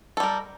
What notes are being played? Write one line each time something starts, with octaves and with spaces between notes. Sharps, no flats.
G3 A4 A#4